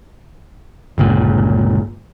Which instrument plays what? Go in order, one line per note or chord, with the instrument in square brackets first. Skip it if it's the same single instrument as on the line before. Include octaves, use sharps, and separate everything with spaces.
[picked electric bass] G1 C#2 A#2